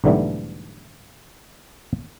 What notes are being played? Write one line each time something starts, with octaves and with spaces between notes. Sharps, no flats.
B1 G#2 D3 E3 G3 A3